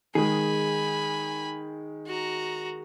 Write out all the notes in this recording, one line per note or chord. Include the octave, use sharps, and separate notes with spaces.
D#3 G#3 G#4 G#5 B5
F#4 A#5